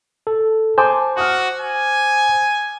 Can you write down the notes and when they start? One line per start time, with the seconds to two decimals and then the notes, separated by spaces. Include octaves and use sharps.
0.27 A4
0.78 C5 G#5 A5 D6
1.17 F#4 D#6 F6
1.61 G#5